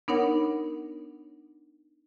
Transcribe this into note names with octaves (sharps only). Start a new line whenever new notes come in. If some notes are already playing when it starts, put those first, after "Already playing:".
B3 D4 D#4 A#4 C#5 F#5